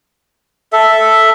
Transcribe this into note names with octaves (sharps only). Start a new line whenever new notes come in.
A4 E5